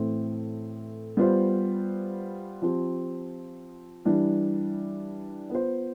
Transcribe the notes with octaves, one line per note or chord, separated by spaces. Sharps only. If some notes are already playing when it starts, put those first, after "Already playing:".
Already playing: A2 E3 A3 C4 E4
G3 B3 F4 C5
F3 C4 G4
E3 G3 D4
B3 F4 C5